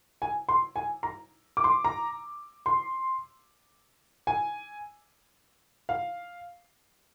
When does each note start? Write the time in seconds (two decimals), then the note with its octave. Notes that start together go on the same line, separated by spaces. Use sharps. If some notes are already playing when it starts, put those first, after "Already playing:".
0.22 G#5
0.49 C6
0.76 G#5
1.03 A#5
1.57 D6
1.64 C6
1.85 A#5
2.66 C6
4.27 G#5
5.89 F5